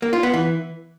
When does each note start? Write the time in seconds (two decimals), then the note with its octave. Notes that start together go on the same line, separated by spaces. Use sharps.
0.02 A#3
0.13 F4
0.23 B3
0.34 E3